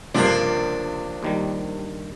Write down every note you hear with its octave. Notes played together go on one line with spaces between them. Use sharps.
C#2 G2 C3 F3 A#3 D4
D#2 D#3 G3